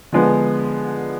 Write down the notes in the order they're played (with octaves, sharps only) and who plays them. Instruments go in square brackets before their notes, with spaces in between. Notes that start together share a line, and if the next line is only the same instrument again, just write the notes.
[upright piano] D3 F3 G#3 B3